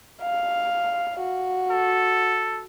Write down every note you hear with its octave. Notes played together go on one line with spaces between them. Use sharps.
F5
F#4
A4